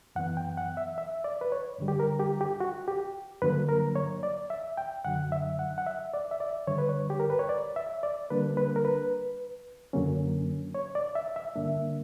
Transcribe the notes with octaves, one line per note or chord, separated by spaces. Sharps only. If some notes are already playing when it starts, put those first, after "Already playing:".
F#2 E3 B3 F#5
G5
F#5
E5
E5
D5
B4
C#5
G2 D3 G3
G4
A#4
G4
G4
F#4
G4
G2 D3 F#3 A#3 B4
A#4
C#5
D5
E5
G5
F#2 D3 F#3 F#5
E5
F#5
F#5
E5
D5
E5
D5
G2 D3 G3 C#5
B4
C#5
G4
A#4
B4
C#5
D5
E5
D5
D3 G3 A#3 D4 B4
B4
A#4
B4
F#2 D3 F#3 A#3 C#4
C#5
D5
E5
E5
G2 D3 A#3 D4